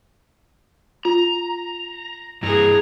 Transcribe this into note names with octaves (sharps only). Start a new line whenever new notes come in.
F4 A#5
G2 E3 G#4 A#5